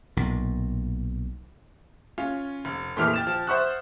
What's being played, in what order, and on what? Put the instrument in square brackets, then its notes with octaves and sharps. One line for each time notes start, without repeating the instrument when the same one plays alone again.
[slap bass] B1 A#2
[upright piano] C#4 F4
F1
F2 A#2 E3 A3 G4 F6
G5 A6 E7
F3
C5 E5 F#5 C#6 D#6 F#6